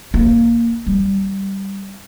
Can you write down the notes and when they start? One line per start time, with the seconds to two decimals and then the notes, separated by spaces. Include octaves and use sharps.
0.14 A#3
0.86 G3